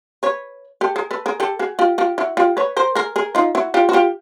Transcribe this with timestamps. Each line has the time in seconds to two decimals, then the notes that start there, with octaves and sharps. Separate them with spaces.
0.23 B4 C#5
0.81 G4 A4
0.96 G#4 A#4
1.11 A4 B4
1.26 G#4 A#4
1.40 G4 A4
1.59 F#4 G#4
1.79 F4 G4
1.98 F4 G4
2.18 E4 F#4
2.37 F4 G4
2.57 B4 C#5
2.77 A#4 C5
2.95 G#4 A#4
3.16 G#4 A#4
3.35 D#4 F4
3.55 E4 F#4
3.74 F4 G4
3.89 F#4
3.93 F4 G4